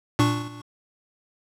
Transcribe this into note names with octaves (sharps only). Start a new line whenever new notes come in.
A#2 D4 C#6